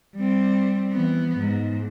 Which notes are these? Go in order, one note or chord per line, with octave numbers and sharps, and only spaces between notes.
G3 C4
E3 B3
G#2